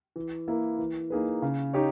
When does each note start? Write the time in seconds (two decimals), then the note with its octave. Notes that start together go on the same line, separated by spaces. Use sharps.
0.16 E3
0.48 A#3 E4 A#4
0.78 E3
1.10 A#3 D#4 G#4 B4
1.42 C#3
1.74 D#4 G4 C#5